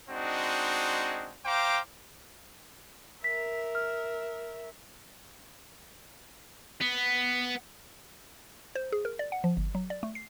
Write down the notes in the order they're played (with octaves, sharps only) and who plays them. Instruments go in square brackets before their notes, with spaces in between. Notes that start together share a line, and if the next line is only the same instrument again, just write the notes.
[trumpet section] G#3 C4 D4 D#4 F#4
C5 F5 G5 A#5 D6
[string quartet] A#4 E5 [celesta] B6
[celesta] F6
[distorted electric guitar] B3
[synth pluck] C5
G#4
A#4
D5
F#5
F3
G1
F#3
D5
A3
C7